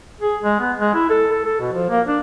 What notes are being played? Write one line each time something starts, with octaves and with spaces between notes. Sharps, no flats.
G#4
G#3
B3
G#3
E4
A4
A4
A4
B2
F3
A#3
D4